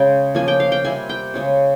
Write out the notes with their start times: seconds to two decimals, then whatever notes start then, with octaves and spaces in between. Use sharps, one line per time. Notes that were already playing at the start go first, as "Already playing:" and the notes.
Already playing: C#3 G#3 C#4 G5
0.35 F3 A#3 C#4 G#5
0.48 G5
0.60 F5
0.72 G5
0.84 C3 G3 C4 G#5
1.09 G5
1.34 C#3 G#3 C#4